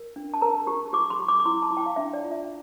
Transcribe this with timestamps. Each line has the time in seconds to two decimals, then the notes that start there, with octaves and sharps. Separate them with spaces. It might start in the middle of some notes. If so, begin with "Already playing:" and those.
Already playing: A#4
0.16 D4
0.34 A5
0.41 A#4 A#5
0.67 G4
0.93 G4 D6
1.10 C6
1.19 G4
1.29 D6
1.40 D6
1.45 E4 C6
1.62 A5
1.71 E4
1.77 G5
1.86 F5
1.96 D4 E5
2.13 D5
2.23 F4
2.31 E5